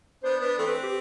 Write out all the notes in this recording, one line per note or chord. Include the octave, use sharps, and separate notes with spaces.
B3 D4 C5
B3 D4 B4
E3 A3 C4 A4
B4
G4